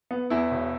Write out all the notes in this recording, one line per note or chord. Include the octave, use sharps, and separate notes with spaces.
B3
E2 E4
E1